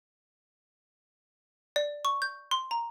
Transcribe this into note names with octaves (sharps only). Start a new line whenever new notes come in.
D5
C#6
G6
C6
A#5